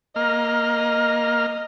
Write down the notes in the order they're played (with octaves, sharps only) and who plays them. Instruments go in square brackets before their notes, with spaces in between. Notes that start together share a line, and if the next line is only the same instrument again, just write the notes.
[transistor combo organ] A#3 F6 [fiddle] D#5